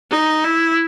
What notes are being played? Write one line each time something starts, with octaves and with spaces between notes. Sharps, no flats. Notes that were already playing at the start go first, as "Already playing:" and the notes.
D#4
E4